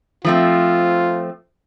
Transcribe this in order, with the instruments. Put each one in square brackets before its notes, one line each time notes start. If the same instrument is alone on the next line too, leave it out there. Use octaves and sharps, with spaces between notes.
[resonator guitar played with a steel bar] F3 A3 C4 [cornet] F4